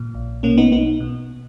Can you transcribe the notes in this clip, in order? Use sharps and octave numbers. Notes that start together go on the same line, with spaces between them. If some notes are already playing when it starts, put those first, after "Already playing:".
Already playing: A#2
A#1
B2 A#3 C#4
B3 D#4
B1 B3 D#4
B2